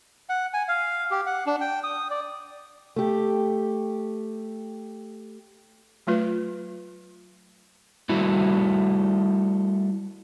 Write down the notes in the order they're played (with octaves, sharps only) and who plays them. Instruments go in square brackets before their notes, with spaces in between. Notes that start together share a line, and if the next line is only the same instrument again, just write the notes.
[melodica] F#5
G#5
F5
G4
F#5
D4
G5
D#6
D5
[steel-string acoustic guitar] A3 G4
[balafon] F#3 A3 F4 B4
[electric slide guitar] G3 A3 E4 F#4